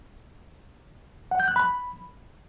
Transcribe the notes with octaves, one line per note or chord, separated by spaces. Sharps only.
F#5
G6
F#6
B5